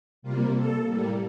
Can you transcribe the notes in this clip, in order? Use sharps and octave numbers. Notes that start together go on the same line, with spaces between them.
C3 G3 A#3 F4
A4
A2 G3 A#3